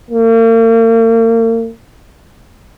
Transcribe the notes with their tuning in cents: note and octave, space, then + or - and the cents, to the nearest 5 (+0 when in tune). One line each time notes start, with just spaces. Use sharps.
A#3 -40